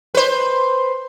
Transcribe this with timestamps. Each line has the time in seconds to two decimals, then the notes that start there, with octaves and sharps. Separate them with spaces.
0.15 B4 C5